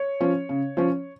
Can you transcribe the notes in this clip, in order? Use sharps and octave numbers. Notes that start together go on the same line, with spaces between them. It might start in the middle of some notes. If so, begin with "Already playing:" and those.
Already playing: C#5
F3 C#4
C#3
F3 C#4